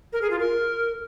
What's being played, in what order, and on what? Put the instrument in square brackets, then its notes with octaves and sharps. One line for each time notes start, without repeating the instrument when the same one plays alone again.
[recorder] A#4
G#4
F4
A#4